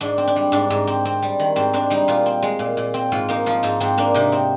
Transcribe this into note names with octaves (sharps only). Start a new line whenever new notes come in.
G#2 D4
C4
D4
G3
G#2 D4
G#2
C4
C4
G3
D#3
G#2 C4
C4 D4
G3 D#4
A#2 F4
C4
G#3
A#2
A#2
C4
G#2 F4
A#3 D#4
F3 F4
G#2 D#4
G#2 C4
A#3 D4
C3 D#4
C4